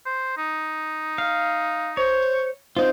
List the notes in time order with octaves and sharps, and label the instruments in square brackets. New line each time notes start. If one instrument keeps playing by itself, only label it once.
[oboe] C5
D#4
[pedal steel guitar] F5
[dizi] C5 [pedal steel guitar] C#5
[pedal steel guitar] C4 D#4 F4 [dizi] C5